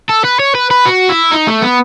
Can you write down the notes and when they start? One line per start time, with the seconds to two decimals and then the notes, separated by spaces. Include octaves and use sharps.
0.09 A4
0.24 B4
0.40 C#5
0.55 B4
0.71 B4
0.86 F#4
1.09 E4
1.31 D#4
1.47 A3
1.62 B3